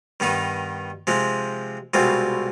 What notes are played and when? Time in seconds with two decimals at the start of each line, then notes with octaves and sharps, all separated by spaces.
0.20 G2 D#3 B3 D#4
1.07 C3 F3 G#3 C4
1.94 C2 B2 G#3 C4 F4